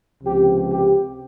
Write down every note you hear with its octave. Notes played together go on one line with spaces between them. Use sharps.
C#2 C3 F3 G4
G4